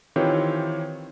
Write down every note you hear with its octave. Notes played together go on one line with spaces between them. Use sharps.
D#3 E3 C4 F4 G4 C#5